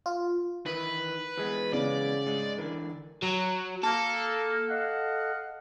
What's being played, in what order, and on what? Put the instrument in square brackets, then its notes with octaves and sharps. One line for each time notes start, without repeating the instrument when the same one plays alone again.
[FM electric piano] F4
[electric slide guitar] D#3 E3 [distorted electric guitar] B4
[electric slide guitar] E3 G#3 B3 [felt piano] G#4
[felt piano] C#3 [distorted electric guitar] D5
[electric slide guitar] G#2 G#3
[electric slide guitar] D3 E3 [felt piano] A#4
[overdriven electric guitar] F#3
[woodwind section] A#3 [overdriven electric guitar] A4
[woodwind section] D#5 F5 F#5